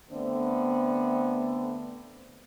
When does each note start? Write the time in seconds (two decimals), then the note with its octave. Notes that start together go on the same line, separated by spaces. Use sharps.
0.12 D3 A3 B3 C4